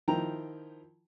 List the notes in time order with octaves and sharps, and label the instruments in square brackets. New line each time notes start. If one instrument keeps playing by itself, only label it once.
[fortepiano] D#3 F3 E4 G5 A#5